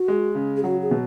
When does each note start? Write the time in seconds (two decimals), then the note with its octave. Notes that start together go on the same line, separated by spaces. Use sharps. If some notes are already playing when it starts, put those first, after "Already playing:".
Already playing: F#4
0.08 G#3
0.35 C#3
0.57 G#4
0.63 F#3 F#4
0.82 G#4
0.91 B2